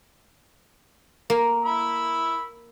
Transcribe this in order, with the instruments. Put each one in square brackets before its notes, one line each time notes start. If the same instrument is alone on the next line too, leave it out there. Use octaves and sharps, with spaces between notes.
[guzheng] A#3
[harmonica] B5 E6